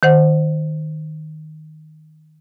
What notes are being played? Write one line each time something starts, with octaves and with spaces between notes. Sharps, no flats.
D#3 C5 F#5